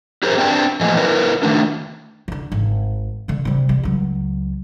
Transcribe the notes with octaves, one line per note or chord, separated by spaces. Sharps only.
G4 G#4 A#4 C5 C#5
C4 D4 G5
E2 A#2 F3 A3 D#5 G#5
E4 A#4 B4 C#5
D#3 A3 D4
D3 E3
G#1
D3 G#3
C3 G3
G3
C#2 F#3